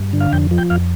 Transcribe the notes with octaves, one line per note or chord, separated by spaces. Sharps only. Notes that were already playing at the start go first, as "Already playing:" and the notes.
Already playing: G2
D3
F5
F2 G5
F3
G5
F2 F5